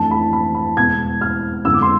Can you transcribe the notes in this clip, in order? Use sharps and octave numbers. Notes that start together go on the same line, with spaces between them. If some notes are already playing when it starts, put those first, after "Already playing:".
Already playing: F2 E3 A3 D4 A5
B5
B5
B5
E2 B2 G#3 B3 G#6
F6
F2 D3 G#3 B3 D4 E6
D6
C6